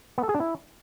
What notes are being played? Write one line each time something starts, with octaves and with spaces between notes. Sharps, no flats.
B3
A4
G#4
D4
E4